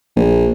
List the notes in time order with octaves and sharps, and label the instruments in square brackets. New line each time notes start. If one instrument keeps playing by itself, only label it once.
[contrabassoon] A#1